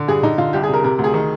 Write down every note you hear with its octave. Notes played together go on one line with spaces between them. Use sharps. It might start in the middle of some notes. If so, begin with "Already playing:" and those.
Already playing: D3
G2 G#4
D3 D#4
D3 F4
C2 G4
G#4
C3 A#4
C3 A#4
D2
G#4
D#3